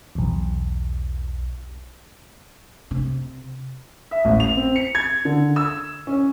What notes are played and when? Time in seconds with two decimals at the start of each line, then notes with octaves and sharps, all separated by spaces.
0.15 B1 E2
2.91 C3
4.11 E5
4.25 A1
4.40 F7
4.57 C4
4.76 C#7
4.95 G#6
5.25 D3
5.56 E6
6.07 C#4